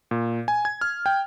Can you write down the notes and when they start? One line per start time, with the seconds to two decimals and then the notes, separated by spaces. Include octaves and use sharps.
0.11 A#2
0.48 G#5
0.65 G#6
0.81 F6
1.06 G5